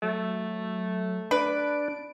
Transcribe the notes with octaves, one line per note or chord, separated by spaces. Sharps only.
F#3 A3
D4 B4 D7